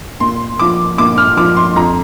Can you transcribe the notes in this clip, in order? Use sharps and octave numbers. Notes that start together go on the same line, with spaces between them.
A#2 C6
F3 D6
A#2 D6
F6
F3 D6
C6
F2 A#5